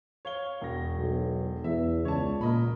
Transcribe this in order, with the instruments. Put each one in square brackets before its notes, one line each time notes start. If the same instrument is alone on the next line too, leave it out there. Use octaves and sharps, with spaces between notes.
[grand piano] C#5 F5 G7
E1 A#6
[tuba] B1
[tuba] E2 [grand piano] E5
[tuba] C#2 [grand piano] C#5 D5 A5
[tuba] A#2 [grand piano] A#4 D#5 B5